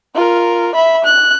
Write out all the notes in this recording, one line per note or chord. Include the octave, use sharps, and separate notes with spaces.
F4 A#4
E5 B5
F#6